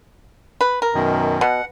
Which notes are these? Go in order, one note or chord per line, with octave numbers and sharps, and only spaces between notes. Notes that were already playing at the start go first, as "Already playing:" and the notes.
B4
A#4
F#2 B2 D#3
B2 F#5